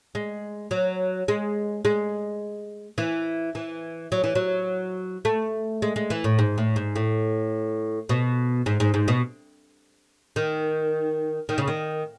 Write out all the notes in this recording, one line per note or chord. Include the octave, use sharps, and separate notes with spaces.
G#3
F#3
G#3
G#3
E3
E3
F#3
E3
F#3
A3
G#3
G#3
E3
A2
G#2
A2
G#2
A2
B2
G#2
G#2
G#2
B2
D#3
D#3
C#3
D#3